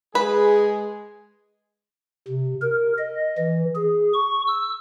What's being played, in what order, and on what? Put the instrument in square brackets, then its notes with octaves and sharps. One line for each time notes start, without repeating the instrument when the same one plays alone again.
[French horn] G#3 [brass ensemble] G#4 [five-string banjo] B4
[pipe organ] C3
A#4
D#5
E3
G#4
C#6
E6